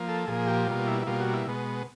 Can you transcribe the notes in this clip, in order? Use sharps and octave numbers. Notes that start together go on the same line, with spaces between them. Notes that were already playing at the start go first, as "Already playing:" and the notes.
Already playing: F3 A#3
A4
A#2 F3 A#3 G#4
G4
B2 G3 A#3 F4
E4
E4
B2 G3 A#3 F4
F#4
E4
B2 G#3 B3